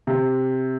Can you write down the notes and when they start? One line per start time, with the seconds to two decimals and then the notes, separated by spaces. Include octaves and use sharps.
0.07 C3